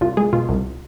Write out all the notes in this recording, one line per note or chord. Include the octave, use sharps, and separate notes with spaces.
C2 F4
G#3 G#4
B2 F4
C2